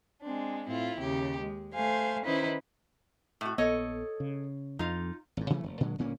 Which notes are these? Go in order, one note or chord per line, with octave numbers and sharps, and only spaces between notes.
G#3 C4 D4
A2 C4 E4 F4
D#2 C#3 G4
G#3
A3 C5 F5 G#5
D#3 C#4 D#4 E4 B4 C5
A2 F#4
A#1 B3 A4 C#5 D#5
C#3
F2 D#4 F4
G#1 G#2
C3 E3 F#3 A3
F1
A#2 D3 F#3 G#3
G1 A#2 A#3 C#4